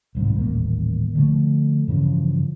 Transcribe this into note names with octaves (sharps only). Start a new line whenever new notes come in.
D#1 C2 G#2
D#1 A1 A#3
D3 F3 A3
G2 C#3 E3 F3